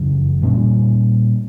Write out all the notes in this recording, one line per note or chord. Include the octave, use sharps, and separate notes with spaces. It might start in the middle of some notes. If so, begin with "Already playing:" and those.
Already playing: F#2 C#3 E3
A#2 G3 A#3 C#4